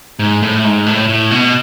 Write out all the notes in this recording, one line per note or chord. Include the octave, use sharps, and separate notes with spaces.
G#2
A2
G#2
A2
A2
B2